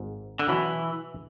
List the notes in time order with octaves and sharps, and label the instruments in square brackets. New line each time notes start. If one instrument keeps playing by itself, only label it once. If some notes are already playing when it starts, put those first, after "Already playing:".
Already playing: [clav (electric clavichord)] G#1 G#2
[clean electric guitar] D3
[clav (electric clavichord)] B2 F#3 C#4 F#4 B4 [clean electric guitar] E3